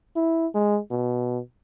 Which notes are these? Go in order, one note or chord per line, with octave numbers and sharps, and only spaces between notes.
E4
G#3
B2